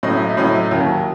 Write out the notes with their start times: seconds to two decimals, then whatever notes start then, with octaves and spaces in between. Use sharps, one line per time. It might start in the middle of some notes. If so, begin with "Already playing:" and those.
0.03 A2 F#3 C#4 E4 D#5
0.16 E5
0.30 D#5
0.37 A2 F#3 C#4 E4
0.71 D#2 D#3 F#3 C#4 E4